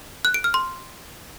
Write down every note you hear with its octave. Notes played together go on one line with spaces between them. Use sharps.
F#6
D7
F6
C6